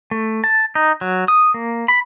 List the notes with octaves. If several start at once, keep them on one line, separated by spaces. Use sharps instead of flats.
A3
A5
D#4
F#3
D#6
A#3
B5